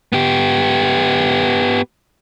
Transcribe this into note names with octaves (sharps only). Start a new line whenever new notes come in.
B3 G4